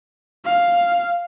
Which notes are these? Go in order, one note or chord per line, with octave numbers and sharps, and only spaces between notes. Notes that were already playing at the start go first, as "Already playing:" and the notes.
F5